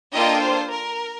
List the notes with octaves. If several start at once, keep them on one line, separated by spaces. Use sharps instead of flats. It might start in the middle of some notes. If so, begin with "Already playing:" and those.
A#3 D4 F4 A4 D#5 G5
C5
A#4